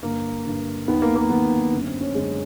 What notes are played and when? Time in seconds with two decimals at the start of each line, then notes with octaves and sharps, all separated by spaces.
0.03 G2 D3 A#3
0.46 G2 D3
0.88 D#2 D#3 B3
1.02 A#3
1.16 A#3
1.30 D#2 D#3 B3
1.73 F#2 D3
1.87 C4
2.00 C#4
2.15 F#2 D3 G#3